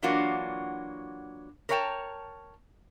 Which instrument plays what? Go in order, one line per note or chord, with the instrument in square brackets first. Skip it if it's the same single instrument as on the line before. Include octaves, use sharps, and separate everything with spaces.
[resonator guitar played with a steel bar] E3 F#3 A#3 D4 F4 F#4
A#4 B4 C#5 F#5 G5 A5